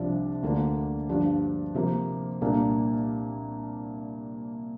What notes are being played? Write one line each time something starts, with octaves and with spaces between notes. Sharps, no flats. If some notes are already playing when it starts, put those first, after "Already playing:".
Already playing: C2 C3 F3 D4
D2 D3 A#3 D4
G2 F3 D4
C3 F3 A#3
C2 A#2 A#3 D4